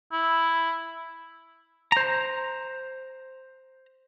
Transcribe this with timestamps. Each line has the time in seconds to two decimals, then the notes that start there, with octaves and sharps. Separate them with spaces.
0.12 E4
1.92 C5 A#5